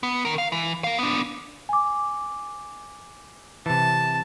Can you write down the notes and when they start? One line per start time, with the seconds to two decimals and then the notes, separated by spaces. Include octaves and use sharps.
0.03 B3
0.25 D#3 A#4
0.38 F5
0.52 E3
0.84 A#3 F5
0.98 B3 D4
1.69 G#5 D6
3.66 C3 E3 A5